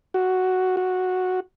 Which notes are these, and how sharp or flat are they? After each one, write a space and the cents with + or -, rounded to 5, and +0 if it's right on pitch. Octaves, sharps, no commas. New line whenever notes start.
F#4 +5
F#4 -5